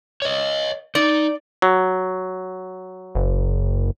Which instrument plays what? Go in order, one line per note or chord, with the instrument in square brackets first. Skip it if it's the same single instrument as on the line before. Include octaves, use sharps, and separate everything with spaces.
[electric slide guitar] C#5 D#5
[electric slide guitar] D#4 [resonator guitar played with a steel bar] D5
[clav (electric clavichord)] F#3
[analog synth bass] F#1